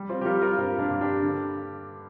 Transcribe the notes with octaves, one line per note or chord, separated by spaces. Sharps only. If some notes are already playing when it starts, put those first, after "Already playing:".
Already playing: G3
C4 F4
G4
G3 F4 A#4
F4 A#4
G2 C4 F4
A#3 D4
G2
D4 G4
D3